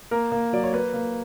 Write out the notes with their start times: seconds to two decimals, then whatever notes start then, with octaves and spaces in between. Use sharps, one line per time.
0.11 A#3 A#4
0.32 A#3
0.53 F#3 D5
0.64 C#5
0.73 A#3 B4
0.94 A#3